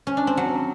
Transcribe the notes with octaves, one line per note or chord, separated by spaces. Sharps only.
C#4
D4
C4
F#3